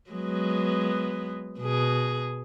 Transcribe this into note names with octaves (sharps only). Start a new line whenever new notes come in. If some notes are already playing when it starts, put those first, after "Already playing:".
F#3 G#3 B3
B2 G#4